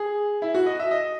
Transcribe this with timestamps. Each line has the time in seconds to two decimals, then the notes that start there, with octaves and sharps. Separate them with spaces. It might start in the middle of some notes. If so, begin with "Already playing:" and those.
Already playing: G#4
0.42 E4
0.54 F#4
0.66 D#5
0.79 E5
0.91 D#5